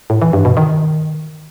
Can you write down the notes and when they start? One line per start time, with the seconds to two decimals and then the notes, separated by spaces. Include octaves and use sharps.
0.10 A2
0.22 E3
0.33 G2
0.45 B2
0.57 D#3